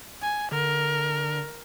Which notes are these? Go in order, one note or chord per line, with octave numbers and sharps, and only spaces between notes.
G#5
D3 A#4